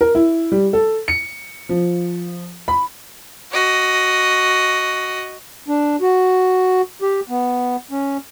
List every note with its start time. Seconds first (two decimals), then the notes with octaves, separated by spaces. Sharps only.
0.01 A#4
0.15 E4
0.52 G3
0.73 A4
1.08 C#7
1.69 F3
2.68 B5
3.52 F#4 D#5
5.68 D4
6.01 F#4
7.02 G4
7.29 B3
7.91 C#4